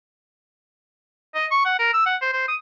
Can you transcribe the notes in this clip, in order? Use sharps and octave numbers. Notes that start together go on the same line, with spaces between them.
D#5
C#6
F#5
A#4
E6
F#5
C5
C5
D#6